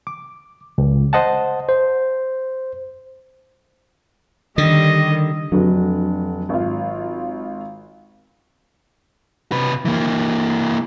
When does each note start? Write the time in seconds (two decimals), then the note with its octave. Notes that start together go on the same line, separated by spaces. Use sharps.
0.07 D6
0.78 C#2
1.13 C5 D#5 F#5 A5
1.69 C5
4.58 D3 D#3 G3 D#5
5.52 F1 D3 F#3
6.49 G#1 F4
9.52 C3 B4
9.85 E3 A#3